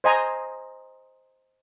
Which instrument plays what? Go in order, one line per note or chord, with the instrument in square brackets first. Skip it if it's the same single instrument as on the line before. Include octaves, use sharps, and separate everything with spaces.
[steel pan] C5 D#5 G#5 A#5